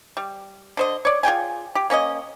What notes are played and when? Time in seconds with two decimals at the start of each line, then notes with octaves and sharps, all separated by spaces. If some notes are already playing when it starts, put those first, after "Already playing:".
0.17 G3
0.77 D3 C5 D#5
1.05 C#5 D5
1.23 F4 G#4 G5 G#5
1.75 G4
1.90 A#3 C#4 D5 D#5